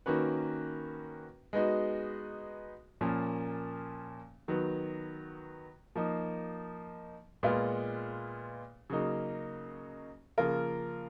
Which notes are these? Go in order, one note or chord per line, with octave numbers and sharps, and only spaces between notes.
D#3 A#3 C#4 F#4 B4
G#3 B3 D#4 F#4
A#2 F3 A#3 C#4
D#3 F#3 B3
F3 A#3 D#4
A#2 G#3 B3 F4 B4
C#3 F#3 A#3 D#4
C#3 F3 A#3 F4 A#4